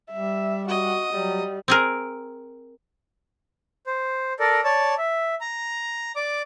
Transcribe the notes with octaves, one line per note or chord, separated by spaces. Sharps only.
G3 E5
F#4 D#5
F#3 G3
C4 G#4 A#4
C5
A4 A#4 D5
C#5 D5 A5
E5
A#5
D5 D6